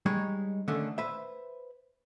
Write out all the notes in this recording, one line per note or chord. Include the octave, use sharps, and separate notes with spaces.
G3 G#3 D#4 C#5
D3 D#3 A3 C#4 D4
B4 C5 E5